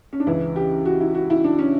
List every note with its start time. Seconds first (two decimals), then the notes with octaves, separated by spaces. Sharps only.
0.13 C#4
0.20 D4
0.27 C#2 C#3 E3 E4
0.56 G4
0.85 F#4
1.01 E4
1.15 F#4
1.30 E4
1.44 D4
1.59 C#4